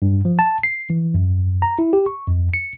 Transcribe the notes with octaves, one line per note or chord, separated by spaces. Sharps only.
G2
F3
A5
C7
E3
F#2
A#5
E4
G4
C#6
F2
C#7